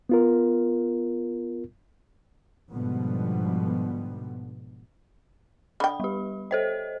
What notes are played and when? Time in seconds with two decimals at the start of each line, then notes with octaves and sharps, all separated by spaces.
0.09 B3 F4 A#4
2.71 G#2 B2 D3 F3 G3 B3
5.80 D3 G5 B5
6.00 G3 G4
6.51 A4 C5 D#5